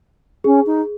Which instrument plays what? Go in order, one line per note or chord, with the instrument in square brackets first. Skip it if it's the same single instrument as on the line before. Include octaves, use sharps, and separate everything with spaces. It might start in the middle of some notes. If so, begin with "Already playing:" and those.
[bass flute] C#4 [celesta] G#4
[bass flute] D#4